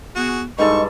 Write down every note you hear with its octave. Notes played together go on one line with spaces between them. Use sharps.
B3 F#4 G#4
G2 G#3 D#4 A4 D#5 C#6